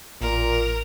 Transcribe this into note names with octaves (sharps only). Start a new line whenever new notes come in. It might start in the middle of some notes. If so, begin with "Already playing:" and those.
A1 A#2 A#4